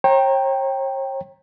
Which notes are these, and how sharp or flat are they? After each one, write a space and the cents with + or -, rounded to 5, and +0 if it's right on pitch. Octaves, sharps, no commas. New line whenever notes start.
C#5 -40 G5 +0 A#5 +0